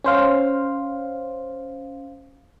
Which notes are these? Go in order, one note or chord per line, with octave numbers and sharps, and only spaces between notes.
C#4 C5 F5